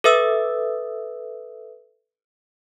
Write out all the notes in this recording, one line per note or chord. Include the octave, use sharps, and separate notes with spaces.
A4 B4 E5 D#6 E6